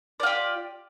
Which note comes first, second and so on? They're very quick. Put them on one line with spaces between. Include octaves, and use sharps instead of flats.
D5 F4 G4